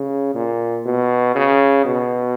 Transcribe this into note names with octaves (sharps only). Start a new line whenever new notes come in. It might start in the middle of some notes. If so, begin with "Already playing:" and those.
Already playing: C#3
A#2
B2
C#3
B2